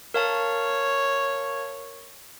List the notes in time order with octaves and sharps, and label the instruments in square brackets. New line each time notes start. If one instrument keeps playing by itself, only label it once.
[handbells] A#4 F5 A5 [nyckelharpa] C#5